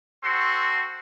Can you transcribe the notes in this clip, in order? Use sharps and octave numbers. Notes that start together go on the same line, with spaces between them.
C4 F#4 A4 C6